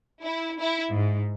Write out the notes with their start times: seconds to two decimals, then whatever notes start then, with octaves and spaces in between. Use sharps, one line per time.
0.24 E4
0.60 E4
0.93 G#2